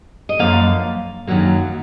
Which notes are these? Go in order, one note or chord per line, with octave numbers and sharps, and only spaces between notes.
D#5
F#2 F3 A#3 F5
F#2 D#3 F#3 A#3